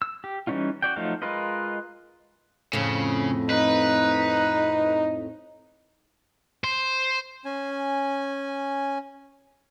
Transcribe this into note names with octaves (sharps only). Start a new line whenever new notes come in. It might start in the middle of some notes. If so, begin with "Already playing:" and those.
E6
G4
E3 G3 C#4 D#4 F4
F#4 D5 G5
F3 F#3 A3 D#4 F5
G#3 F4 A#4 B4 D#5
F2 A2 C#3
D#4 B4
C5 C6
C#4 G#5